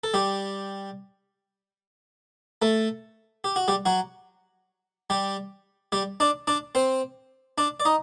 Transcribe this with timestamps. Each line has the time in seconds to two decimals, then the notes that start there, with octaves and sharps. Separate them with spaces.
0.04 A4
0.14 G3 G4
2.62 A3 A4
3.44 G4
3.56 F#4
3.68 G3 G4
3.86 F#3 F#4
5.10 G3 G4
5.92 G3 G4
6.20 D4 D5
6.47 D4 D5
6.75 C4 C5
7.58 D4 D5
7.80 D5
7.85 D#4 D#5